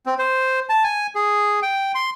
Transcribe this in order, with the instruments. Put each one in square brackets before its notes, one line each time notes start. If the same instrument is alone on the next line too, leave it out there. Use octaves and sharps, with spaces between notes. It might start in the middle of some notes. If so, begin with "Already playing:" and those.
[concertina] C4
C5
A5
G#5
G#4
G5
C6